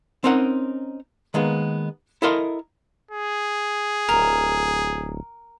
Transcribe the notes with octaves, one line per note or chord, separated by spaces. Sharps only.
C4 C#4 D#4 A#4 F#5
D#3 G#3 A#3 B3
E4 A4 A#4 D#5 F5 C6
G#4
D1 A#4